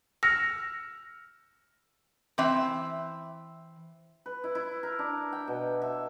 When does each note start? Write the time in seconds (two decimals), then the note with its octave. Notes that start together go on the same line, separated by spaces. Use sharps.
0.23 E6 F6 A#6 C#7
2.38 E3 C4 E5
4.26 B4
4.44 E4
4.55 E4
4.83 A#4
4.99 D4
5.33 G5
5.47 B2
5.82 E5